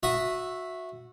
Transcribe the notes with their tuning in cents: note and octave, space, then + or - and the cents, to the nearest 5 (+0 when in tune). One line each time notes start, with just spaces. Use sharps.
F#4 -20 E5 +0 D#6 +0